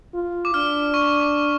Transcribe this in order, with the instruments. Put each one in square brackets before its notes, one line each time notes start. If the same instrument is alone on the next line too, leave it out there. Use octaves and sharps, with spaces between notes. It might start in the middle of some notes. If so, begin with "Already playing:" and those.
[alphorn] F4
[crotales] D6
[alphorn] D4 [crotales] F6
[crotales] C#6
D6